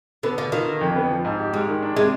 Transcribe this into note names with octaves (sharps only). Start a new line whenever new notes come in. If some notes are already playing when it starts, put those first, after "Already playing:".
D3 B3
B2 D3
D#3 F4
D3
F2
B3
F3
G#2
G4
G3 G#3
D#3
D4
C3 G#3